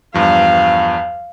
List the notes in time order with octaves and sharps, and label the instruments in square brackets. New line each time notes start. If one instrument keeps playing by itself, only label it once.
[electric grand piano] E2 G2 F3 [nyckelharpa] F5